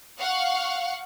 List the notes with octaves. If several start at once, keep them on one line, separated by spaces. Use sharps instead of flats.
F5 F#5 C#6